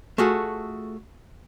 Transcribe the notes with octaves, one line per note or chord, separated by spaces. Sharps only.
A3 F4 F#4 G#4 A4